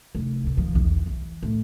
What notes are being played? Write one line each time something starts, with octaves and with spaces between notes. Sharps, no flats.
F1
B2 D3
D#3 F3
B1 E2
E3
A2